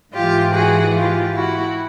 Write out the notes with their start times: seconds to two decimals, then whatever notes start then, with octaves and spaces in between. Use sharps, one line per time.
0.13 G#2 E3 F4 G4
0.54 F#4 G#4
0.94 F4 G4
1.34 E4 F#4